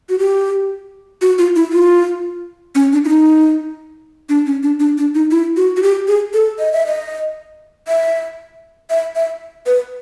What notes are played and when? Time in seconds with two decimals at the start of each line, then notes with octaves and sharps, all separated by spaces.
0.09 F#4
0.19 G4
1.22 F#4
1.39 F4
1.56 E4
1.73 F4
2.75 C#4
2.93 D4
3.05 E4
3.09 D#4
4.29 D4
4.46 C#4
4.63 D4
4.80 D4
4.98 D4
5.15 D#4
5.31 E4
5.57 F#4
5.77 F#4
5.83 G4
6.08 G#4
6.34 A4
6.59 D#5
6.73 E5
6.87 D#5
7.88 E5
8.90 E5
9.16 E5
9.66 B4